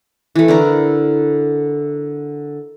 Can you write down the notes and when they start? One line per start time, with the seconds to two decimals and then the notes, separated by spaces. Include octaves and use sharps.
0.35 E3 A3
0.48 D3 E4 A#4